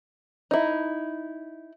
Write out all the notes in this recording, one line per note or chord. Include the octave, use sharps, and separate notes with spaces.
D#4 E4